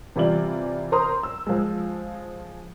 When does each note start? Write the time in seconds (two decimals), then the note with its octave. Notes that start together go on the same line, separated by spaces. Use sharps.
0.16 C3 E3 G3 F4 D5 F#7
0.92 A#4 C5 A#5 C6 D#6
1.23 E6
1.47 F3 G#3